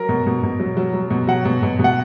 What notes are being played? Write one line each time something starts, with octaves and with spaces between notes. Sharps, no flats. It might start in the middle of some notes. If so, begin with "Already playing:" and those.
Already playing: F#3 A#4
B2
B2
B2
F#3
F#3
F#3
B2
F#3 F#5
B2
B2
B2 F#5